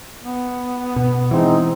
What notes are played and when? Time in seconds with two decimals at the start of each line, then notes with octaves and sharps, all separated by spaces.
0.23 B3
0.96 B2
1.31 E3 G#3 C4 D#4